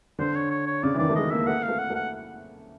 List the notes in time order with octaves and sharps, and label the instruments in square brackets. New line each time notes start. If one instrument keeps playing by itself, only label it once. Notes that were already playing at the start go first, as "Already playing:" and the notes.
[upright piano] D3 [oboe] C5
[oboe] C#5
C#5
C#5
[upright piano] C#3 [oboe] D5
[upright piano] E3
[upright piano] D#3 [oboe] D5
[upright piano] A3
[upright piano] G#3 [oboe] D#5
[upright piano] A#3 [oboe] E5
[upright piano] A3 [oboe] F#5
[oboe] F5
[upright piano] A3
[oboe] F#5
[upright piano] A3
[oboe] F#5